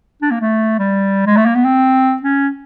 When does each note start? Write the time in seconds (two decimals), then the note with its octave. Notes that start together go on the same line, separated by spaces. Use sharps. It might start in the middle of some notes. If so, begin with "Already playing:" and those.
0.22 D4
0.31 A#3
0.40 A3
0.79 G3
1.26 G#3
1.37 A3
1.46 A#3
1.55 B3
1.65 C4
2.22 C#4